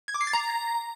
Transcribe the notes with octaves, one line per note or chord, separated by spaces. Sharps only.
G#6
D6
C7
A6
A#5